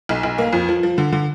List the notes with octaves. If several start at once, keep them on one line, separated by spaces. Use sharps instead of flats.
B1
B1
A#3
F2
F3
F3
D3
D3